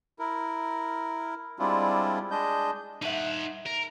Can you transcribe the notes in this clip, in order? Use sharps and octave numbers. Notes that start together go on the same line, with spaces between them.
E4 A#4
G3 G#3 C4 D4 E4 F4
G#3 D4 D#5 G6
G2 D#4 E5 F#5
A#4